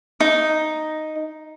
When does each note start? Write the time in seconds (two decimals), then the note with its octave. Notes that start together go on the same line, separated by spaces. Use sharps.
0.20 D#4